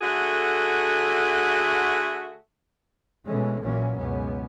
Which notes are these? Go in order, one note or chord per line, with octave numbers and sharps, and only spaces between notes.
D3 A3 F#4 G#4
B2 E3 G#3 A3 C#4
A#1 A#2 E3 F#3 A#3 C#4
C#2 F#2 B2 B3 C#4